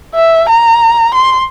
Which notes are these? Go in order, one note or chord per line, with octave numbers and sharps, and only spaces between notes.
E5
A#5
C6